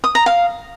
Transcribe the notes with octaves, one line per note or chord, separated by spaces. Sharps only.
D#6
A#5
F5